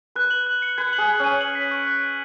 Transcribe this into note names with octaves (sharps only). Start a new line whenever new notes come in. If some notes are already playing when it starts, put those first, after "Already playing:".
B4 F#6
F#7
F#6
C#7
B4 G#6
F#7
G#4
G#6
C#4 D#7
F#7
B6
C#6
F#6
F#6